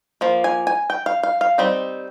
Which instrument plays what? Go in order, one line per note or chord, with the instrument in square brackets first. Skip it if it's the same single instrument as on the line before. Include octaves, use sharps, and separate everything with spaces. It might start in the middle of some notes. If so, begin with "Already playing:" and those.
[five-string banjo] F3 A#3
G#5
G#5
G5
F5
F5
F5
G3 C4 D#4